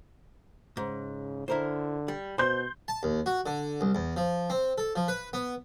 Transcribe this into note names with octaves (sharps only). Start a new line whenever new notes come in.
G#2 C#3
D3 E4 A#4 C5
G3
B2 C5 C6 G6
A5
D#2
F#4
D3
C2
E2
F3
C4
A4
F3
B4
B3